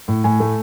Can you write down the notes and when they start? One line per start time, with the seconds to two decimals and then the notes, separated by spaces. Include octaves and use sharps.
0.08 A2
0.24 A2 G#5
0.40 A3